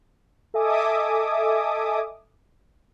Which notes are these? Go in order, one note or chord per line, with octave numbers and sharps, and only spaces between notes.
A4 D#5 E5 G#5 D6 D#6